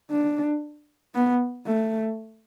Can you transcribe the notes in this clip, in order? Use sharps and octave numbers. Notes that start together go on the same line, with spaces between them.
D4
B3
A3